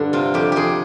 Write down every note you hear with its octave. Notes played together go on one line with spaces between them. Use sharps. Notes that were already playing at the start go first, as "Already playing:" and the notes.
Already playing: G2 D3
C3 F4
F2 G4
F2 G4 G#4